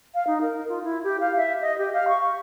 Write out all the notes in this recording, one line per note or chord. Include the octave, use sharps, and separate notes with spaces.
F5
D#4
A#4
F4
E4
G4
F5
E5
D#5
G4
F5
C#6